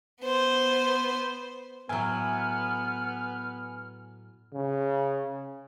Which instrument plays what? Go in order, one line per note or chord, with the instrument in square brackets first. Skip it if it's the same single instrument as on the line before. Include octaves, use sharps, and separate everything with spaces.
[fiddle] B3 C5
[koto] A2 F#3 [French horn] B3 [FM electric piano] G#5 [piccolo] F6
[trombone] C#3